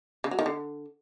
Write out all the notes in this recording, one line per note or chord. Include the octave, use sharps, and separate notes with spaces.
C#3
F#3
D#3
D3